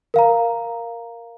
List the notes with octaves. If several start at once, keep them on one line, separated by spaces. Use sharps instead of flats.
A#4 F5 A#5